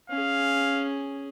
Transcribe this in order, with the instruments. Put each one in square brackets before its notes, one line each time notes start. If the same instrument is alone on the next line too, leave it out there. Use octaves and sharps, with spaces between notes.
[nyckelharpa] C#4 G#4 [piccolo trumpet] F5